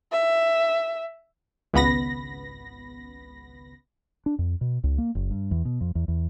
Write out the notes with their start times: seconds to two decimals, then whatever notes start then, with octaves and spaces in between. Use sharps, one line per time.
0.12 E5
1.74 G#1 C#2 B3 B5 A#6
4.26 D4
4.39 F2
4.61 B2
4.84 C#2
4.98 A#3
5.15 F#1
5.31 G2
5.51 E2
5.65 B2
5.81 F2
5.95 E2
6.08 E2